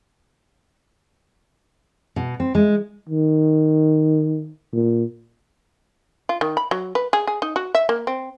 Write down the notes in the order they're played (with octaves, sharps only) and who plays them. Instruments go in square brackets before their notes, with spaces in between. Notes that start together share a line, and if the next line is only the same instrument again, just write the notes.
[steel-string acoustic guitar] B2
C4
G#3
[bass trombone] D#3
A#2
[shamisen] F4
D#3
B5
F#3
B4
G#4
G#4
D#4
F#4
E5
A#3
C4